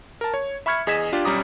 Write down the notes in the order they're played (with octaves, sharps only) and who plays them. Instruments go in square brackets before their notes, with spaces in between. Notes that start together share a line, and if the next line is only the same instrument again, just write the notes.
[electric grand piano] A#4 A5
C#5
E5 B5 C#6 F6 G#6 C#7
E2 G#4 D#5 G#6 B6 E7
D4 F4 G4
B1 G3 C#4 A#5 D6 D#6